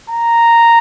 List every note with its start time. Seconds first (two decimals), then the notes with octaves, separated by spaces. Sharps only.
0.10 A#5